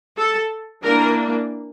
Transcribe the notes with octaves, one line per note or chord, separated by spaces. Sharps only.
A4
E3 A#3 D4 A#4